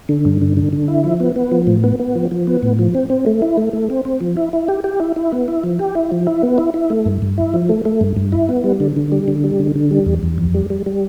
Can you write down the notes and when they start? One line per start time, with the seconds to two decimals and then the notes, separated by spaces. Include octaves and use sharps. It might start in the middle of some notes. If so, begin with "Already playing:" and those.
0.09 D3
0.25 G2
0.42 D3
0.57 D3
0.73 D3
0.88 E4
1.04 F3
1.20 B3
1.36 B3
1.52 F3
1.67 A2
1.84 B3
1.99 B3
2.15 F3
2.31 F3
2.47 B3
2.63 A2
2.79 F3
2.95 C4
3.10 C4
3.26 A3
3.42 E4
3.57 A3
3.73 A3
3.90 C4
4.05 C4
4.21 F3
4.37 E4
4.53 E4
4.68 G4
4.84 G4
5.00 E4
5.16 E4
5.32 B3
5.48 E4
5.64 F3
5.79 G4
5.95 E4
6.12 F3
6.27 E4
6.43 B3
6.58 E4
6.74 E4
6.90 A3
7.06 G2
7.22 G2
7.38 E4
7.54 F3
7.69 A3
7.85 A3
8.01 G2
8.16 G2
8.32 E4
8.49 B3
8.64 G3
8.80 D3
8.96 D3
9.12 G3
9.28 D3
9.44 G3
9.59 D3
9.76 D3
9.91 G3
10.06 E2
10.23 E2
10.38 F2
10.55 G3
10.70 G3
10.86 G3